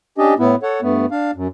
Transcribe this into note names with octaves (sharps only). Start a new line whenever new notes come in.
C#4 D4 G4 D#5
A2 B3 E4
A4 C#5 F#5
G2 A3 B3
D4 F5
F#2